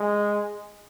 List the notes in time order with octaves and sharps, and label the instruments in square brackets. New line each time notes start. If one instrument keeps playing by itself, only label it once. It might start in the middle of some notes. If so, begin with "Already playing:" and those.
Already playing: [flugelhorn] G#3